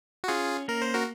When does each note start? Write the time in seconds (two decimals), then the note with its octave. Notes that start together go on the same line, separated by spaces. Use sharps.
0.24 F#4
0.28 C#4 F4 G#4
0.68 A#3 A#4
0.82 C5
0.94 F#4 A#4